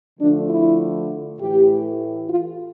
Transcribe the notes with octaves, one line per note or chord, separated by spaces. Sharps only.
D3 F3 A3 D4
E4
A2 E3 A3 G4
F4